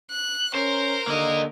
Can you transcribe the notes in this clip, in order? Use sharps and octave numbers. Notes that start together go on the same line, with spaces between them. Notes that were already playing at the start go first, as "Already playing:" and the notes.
F#6
C#4 A#4 C5
D3 A#3 D#5